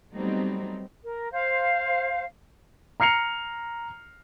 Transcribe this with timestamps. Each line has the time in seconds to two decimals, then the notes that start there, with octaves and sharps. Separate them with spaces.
0.13 F#3 G3 A3 B3 C4 D#4
1.03 A#4
1.32 C5 F5
3.00 A#5 F6 C7 C#7 F7